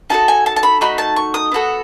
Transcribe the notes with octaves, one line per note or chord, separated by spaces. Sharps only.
D#4 F#4 A4 A5
G#5
A5
A5
B5
A3 D#4 F#4 B5
A5
C#6
D#6
B3 F#4 A4